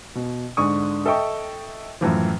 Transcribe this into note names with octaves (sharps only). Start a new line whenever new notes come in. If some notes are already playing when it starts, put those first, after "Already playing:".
B2
G#2 D3 C#6 D#6
A4 D#5 E5 G5 C#6
F#2 A2 E3 F3